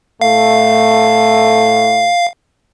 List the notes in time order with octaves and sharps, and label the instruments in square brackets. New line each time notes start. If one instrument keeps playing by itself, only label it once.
[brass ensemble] A2 A3 [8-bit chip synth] F5